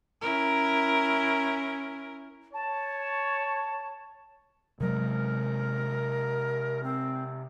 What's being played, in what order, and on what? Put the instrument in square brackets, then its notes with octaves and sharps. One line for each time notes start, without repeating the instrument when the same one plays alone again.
[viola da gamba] C#4 E4 A#4
[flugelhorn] C#5 [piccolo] A5
[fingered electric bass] C3 F#3 G#3 [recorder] A#4
[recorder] C4